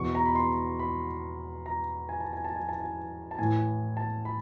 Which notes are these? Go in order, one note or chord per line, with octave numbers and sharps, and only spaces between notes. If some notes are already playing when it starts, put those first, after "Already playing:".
Already playing: E2 B2 C#6
A#5
B5
C6
B5
A#5
G#5
A5
G#5
A5
G#5
A5
G#5
A5
A2 E3 G#5
A5
B5